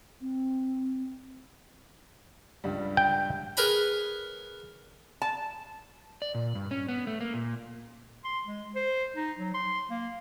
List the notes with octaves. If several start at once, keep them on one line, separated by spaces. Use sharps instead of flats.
C4
C#2 G2 G3
G5
G#4 A#4 B4 C#5 A#5 B5
A5
D5
A#2
G2
C#4
B3
A3
A#3
A#2
C6
G#3
C5
D#4
F#3
C6
A#3